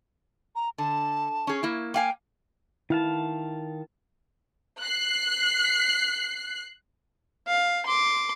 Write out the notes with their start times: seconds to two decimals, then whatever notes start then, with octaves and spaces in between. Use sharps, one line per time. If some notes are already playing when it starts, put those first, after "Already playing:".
0.55 A#5
0.78 D3 A5
1.47 C#4 G#4
1.63 A#3 E4
1.94 A#3 F5 G5 G#5
2.90 D#3 E4 F5 A5
4.80 F#6 C7
7.48 F5
7.87 C6 D6